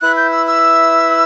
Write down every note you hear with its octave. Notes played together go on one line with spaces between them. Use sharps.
E4 B4 E5 F#6
G6
E6
E6